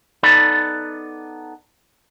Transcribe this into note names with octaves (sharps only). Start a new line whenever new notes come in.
B3 D#4 A4 D5 B5